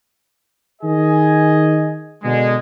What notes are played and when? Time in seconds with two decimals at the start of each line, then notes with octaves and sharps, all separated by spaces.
0.82 D#3 G#4 D#5 G#5
2.23 B2 D3 G#3